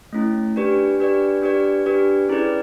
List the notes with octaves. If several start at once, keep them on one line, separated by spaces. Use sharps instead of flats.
A3 C#4 E4
D4 G4 B4 D5
D4 G4 B4 D5
D4 G4 B4 D5
D4 G4 B4 D5
C#4 E4 G#4 B4 D5